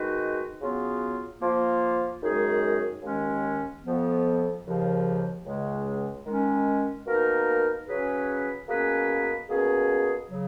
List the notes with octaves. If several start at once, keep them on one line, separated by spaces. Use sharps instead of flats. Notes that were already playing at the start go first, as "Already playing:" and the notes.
Already playing: D#3 G#3 D#4 F#4 B4
C#3 F#3 B3 F4
F3 A#3 F4
F#2 D#3 G#3 D#4 G#4
D#2 D#3 G#3 C#4
F2 F3 B3
D#2 C#3 F3
C#2 C#3 G#3
D#3 G#3 C#4
B2 A#3 D#4 A#4
C#3 F#3 C#4 G#4 B4
B2 A#3 C#4 G#4 B4
B2 A#3 C#4 G#4
C#3 F#3